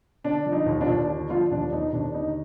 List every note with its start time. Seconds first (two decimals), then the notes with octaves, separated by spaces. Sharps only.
0.24 D3 D4
0.45 F3
0.52 D#4
0.66 D#2
0.80 D4 F4
0.87 D#2
1.09 D3
1.29 F3 D4 F4
1.51 D#2 D4
1.72 D#2 D#4
1.93 D#2 D4
2.14 D3 D#4